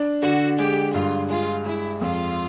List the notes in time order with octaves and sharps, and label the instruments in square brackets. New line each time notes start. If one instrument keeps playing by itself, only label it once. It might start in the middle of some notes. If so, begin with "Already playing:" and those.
Already playing: [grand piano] D4
[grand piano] D3 [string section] F#4
[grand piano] G#3 [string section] G4
[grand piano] G2 [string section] F4
[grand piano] G#3 [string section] F4
[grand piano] G#3 [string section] E4
[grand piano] F2 [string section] F4